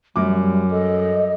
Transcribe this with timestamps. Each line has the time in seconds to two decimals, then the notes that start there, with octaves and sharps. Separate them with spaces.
0.16 F#2 G3 D6
0.71 A4 D#5